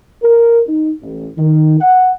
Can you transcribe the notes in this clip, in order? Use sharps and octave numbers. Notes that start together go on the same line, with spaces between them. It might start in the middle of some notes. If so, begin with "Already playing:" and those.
A#4
D#4
A1
D#3
F#5